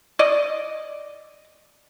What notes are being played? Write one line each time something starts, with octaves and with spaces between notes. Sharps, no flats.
D5 D#5